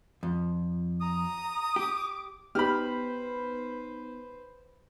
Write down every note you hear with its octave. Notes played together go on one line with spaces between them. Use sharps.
F2
A#5 D#6
G4 D6
B3 D#4 G4 B4 C5 B5 F6